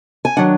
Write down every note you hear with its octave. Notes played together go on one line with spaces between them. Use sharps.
G#5
D#3 F#3 D4 F#5